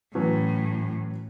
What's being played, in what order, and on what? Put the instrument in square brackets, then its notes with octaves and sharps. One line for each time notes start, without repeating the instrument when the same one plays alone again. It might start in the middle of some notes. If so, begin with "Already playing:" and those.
[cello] A2 [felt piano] E3 F#3 C#4